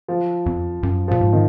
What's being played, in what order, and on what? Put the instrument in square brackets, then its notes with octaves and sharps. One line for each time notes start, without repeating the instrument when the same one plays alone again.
[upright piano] F3
[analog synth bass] F2
F#2
[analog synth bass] A#2 [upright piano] F3
[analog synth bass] G#2
[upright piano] D#3